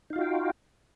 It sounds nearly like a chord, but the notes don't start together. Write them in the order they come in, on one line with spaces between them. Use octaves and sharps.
D#4 F5 F4 F#4 G5